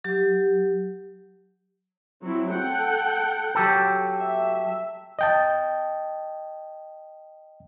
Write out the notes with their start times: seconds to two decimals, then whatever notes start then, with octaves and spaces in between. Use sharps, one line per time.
0.04 F#3 G4
2.23 F#3 C4 E4
2.55 A4 F#5 G5
3.55 F#3 G4 A4
4.18 E5
5.19 D#5 G5 A5